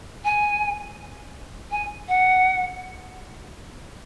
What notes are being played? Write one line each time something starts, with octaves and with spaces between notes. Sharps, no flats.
G#5
G#5
F#5